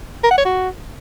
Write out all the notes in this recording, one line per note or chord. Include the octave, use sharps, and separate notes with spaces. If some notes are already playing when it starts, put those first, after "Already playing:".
A#4
F#5
C#5
F#4